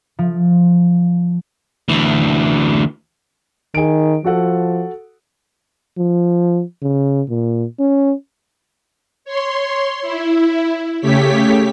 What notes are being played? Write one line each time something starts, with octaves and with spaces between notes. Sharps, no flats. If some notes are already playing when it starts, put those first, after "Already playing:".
F3
D2 E3
D#3 G#4 D7
F3 F#4 A4 F#5
F3
C#3
A#2
C#4
C#5 C6
E4
C#3 A3 G4 C#5 B6